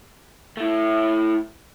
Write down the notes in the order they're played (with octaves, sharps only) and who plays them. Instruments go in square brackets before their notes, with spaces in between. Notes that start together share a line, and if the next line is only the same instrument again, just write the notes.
[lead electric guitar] A3 E4